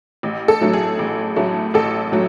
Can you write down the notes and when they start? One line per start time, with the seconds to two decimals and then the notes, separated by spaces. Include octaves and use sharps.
0.23 A1
0.48 A4
0.61 A2 F#3 A3
0.73 G#4
0.99 A1
1.36 A2 F#3 A3
1.74 A1 A4
2.12 A2 F#3